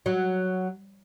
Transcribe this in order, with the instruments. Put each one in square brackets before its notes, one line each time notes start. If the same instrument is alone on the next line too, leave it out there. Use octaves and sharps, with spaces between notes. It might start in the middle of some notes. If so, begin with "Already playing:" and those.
[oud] F#3